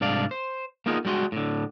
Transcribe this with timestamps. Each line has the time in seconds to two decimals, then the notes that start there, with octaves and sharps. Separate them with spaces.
0.01 C2 G#2 D4 D5 F5
0.31 C5
0.86 A#3 B3 D#4 F4 G#4
1.05 G3 G#3 F#4 C6
1.32 A2 D3